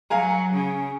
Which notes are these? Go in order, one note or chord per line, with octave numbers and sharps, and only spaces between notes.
F#3 F5 G#5 A#5
C#3 C#4